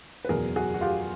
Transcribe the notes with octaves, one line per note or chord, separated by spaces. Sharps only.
B4
F#1 E2 B2 G#4 A#4
F#4 G#4
F#4
F4 G4